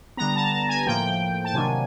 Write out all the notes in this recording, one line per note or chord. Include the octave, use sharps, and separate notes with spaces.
D3 G3 B3 A#5
A5
A5
G#5
A2 F3 A#3 G5
A5
C3 D#3 F#3 A#3 D4 G#5